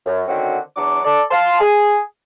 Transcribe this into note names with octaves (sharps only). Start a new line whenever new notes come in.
F#2
D3 D#3 C4 C#4 F#4
E2 F#3 D4 D6
A4 D5
F5 A5 C6
G#4